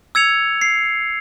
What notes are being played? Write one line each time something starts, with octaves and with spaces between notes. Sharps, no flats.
E6 G#6 C#7 F7
C7